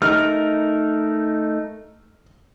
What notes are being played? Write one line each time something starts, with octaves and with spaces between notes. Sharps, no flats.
A3 D#4 A#4 F6